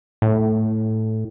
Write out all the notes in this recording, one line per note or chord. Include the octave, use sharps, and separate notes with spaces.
A2